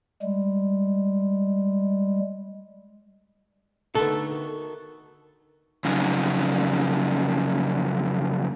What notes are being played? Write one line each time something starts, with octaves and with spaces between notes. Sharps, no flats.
G3 G#3
D3 D#3 A3 B3 F#4 A4
F2 C#3 F#3 C#4 D#4